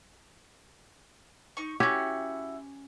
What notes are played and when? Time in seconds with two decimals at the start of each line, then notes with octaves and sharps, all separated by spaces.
1.57 D#4 C#6
1.80 C#4 E4 F#4 G4